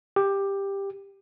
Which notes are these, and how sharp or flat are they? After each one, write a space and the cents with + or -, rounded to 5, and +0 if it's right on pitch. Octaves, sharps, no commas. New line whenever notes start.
G4 +10